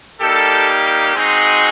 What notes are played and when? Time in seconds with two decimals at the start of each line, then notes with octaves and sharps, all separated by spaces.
0.21 G3 A#3 D#4 G4 A4
1.15 G#3 C4 D#4 F#4 G#4